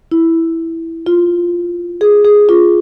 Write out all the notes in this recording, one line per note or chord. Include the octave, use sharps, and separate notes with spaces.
E4
F4
G#4
G#4
F4